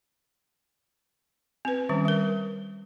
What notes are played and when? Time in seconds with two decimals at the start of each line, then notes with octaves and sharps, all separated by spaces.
1.65 C4 B4
1.89 D#3 G3 C#4
2.05 G3 A#4